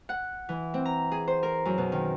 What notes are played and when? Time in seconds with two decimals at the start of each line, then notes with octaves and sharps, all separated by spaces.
0.09 F#5
0.49 E3
0.74 C4
0.85 A#5
1.11 G#4
1.28 C5
1.43 A#4
1.65 F#2
1.78 B2
1.92 D#3